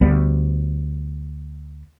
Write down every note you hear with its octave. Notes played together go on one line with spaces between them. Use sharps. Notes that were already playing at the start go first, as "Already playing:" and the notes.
D2 G3 B3